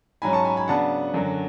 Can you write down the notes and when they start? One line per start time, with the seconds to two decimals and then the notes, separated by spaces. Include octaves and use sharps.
0.22 G#2 F#3 C#4 G#5 B5
0.33 A5 C#6
0.45 G#5 B5
0.57 G#5 B5
0.68 C#3 F#3 B3 D4 F#5 A5
1.14 F#2 D3 F#3